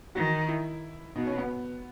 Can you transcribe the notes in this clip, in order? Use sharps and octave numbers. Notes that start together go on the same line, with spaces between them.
D#3 F#4
E4
B2 D#4
C#4
B3